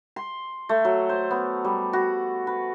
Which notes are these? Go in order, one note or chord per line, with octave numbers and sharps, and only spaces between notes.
C6
A3
F#3
C5
B3
G3
F#4
B4